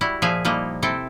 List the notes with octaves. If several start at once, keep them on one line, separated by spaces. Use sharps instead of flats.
G3 E4 F#4
A#2 F3 G#4 E5 F5 G#5
F3 G3 A#3 D#4 E4
C3 C4 E4 A4 G5